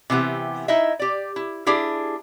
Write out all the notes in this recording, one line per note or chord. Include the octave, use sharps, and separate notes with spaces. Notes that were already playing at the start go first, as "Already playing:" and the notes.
C3 E3 B3 G4
D#4 E4 D#5 E5
G4 D5
E4
D4 E4 G4 G#4